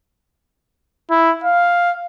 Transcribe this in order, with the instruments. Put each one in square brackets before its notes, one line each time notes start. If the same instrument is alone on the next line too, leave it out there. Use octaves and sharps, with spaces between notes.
[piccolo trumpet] E4
F5